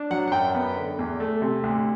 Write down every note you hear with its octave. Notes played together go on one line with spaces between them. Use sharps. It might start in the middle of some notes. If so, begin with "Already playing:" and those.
Already playing: D4
F#3 F#5
F#5
F#2 G5
B3
D3
E2
A3
C3
D2